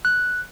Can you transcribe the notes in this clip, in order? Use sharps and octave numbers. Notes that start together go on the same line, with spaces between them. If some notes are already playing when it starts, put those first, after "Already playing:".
F#6